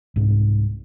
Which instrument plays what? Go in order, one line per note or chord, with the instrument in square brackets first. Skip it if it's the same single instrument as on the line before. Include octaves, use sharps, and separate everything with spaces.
[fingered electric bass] C2 G#2